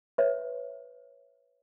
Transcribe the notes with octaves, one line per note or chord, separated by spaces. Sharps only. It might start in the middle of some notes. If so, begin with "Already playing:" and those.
B4 C#5 E5